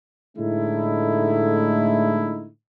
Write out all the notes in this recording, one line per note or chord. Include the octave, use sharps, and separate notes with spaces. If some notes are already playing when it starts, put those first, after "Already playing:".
A2 D3 G#3 A3 D#4 E4